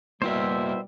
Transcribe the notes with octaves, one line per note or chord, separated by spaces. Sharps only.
B2 G3 A#3 E4 A#4 C5 E5